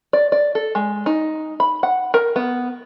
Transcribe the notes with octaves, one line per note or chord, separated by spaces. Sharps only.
D5
D5
A4
G#3
D#4
B5
F#5
A#4
B3